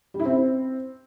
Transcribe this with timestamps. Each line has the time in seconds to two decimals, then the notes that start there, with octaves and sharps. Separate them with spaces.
0.14 G3
0.20 E4
0.25 C4